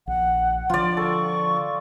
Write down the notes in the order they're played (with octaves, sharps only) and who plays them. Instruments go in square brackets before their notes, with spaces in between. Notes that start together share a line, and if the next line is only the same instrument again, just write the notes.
[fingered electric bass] A#1 [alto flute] F#5
[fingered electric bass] D3 F3 [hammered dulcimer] F4 D5
[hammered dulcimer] A4 [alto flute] C#6